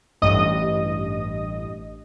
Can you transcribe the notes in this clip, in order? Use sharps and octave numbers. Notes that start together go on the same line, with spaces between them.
A1 G2 D#5 D#6